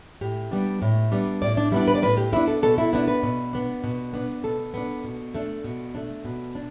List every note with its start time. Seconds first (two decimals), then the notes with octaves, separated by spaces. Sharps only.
0.21 A2 G4
0.51 G3 B3 D4
0.82 A2
1.12 G3 B3 D4
1.42 A2 D5
1.57 D4
1.72 G3 B3 D4 E4
1.88 B4
1.95 D5
2.02 A2 B4
2.17 G4
2.33 G3 B3 D4 E4
2.48 A4
2.63 B2 A4
2.78 E4
2.93 B3 D4 E4
3.08 B4
3.23 B2
3.53 B3 D4
3.84 B2
4.13 B3 D4
4.43 B2 A4
4.74 B3 D4
5.04 B2
5.35 A3 D4
5.64 B2
5.95 A3 D4
6.25 B2
6.55 D4